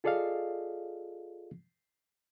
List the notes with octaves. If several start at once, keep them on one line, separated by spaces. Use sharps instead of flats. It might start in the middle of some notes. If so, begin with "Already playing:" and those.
F4 G#4 A4 D5 D#5 F5